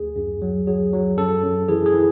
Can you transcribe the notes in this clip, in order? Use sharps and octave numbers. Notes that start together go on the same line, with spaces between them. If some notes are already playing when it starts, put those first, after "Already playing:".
Already playing: D2 G#4
F#2
F#3
F#3 G#4
F#3
F#2 A4
F#2
E3 G#4
G#4
E3